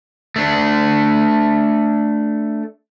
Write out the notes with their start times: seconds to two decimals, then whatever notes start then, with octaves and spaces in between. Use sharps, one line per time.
0.36 A3 D4